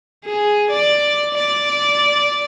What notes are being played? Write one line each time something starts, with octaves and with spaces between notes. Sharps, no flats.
G#4
D5
D5